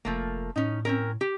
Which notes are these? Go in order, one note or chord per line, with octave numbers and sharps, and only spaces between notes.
F1 F3 A3 A#3
A2 C#4 D#4
C4 C#4 A#4
G4